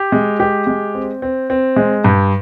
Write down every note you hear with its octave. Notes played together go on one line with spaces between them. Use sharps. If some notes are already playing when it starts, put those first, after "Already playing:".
Already playing: G4
G#3
G4
G#3
C4
C4
C4
G#3
G2